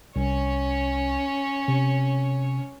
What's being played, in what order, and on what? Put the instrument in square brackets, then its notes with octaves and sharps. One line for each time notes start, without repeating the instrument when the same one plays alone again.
[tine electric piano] C2 [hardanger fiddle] C#4 C#5
[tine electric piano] C3